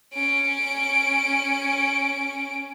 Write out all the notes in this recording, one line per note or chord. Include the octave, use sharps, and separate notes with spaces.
C#4 D7